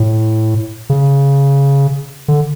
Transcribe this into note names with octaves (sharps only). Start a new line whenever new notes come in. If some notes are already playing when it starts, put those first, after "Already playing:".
Already playing: A2
C#3
D3